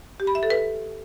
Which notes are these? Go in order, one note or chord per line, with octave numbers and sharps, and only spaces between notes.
G4
B5
E5
A4
B4